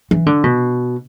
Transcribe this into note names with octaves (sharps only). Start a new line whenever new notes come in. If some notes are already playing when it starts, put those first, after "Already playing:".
E3
D3
B2